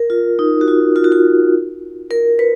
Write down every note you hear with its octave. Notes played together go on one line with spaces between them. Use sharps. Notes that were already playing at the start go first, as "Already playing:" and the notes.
Already playing: A#4
F4
D#4
F#4
F4
F4
F#4
F4
A#4
B4